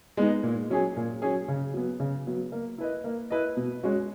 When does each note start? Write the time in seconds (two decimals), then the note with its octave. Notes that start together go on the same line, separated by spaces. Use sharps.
0.17 G#3 B3 D#4
0.43 A#2
0.70 F#3 C#4 G#4
0.97 A#2
1.22 F#3 C#4 G#4
1.48 C#3
1.74 F#3 B3
2.00 C#3
2.27 F#3 B3
2.52 A#3
2.78 E4 B4 D#5
3.04 A#3
3.30 E4 B4 D#5
3.57 B2
3.83 G#3 C#4 F#4